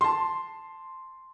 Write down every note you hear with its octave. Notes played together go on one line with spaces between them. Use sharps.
A5 C6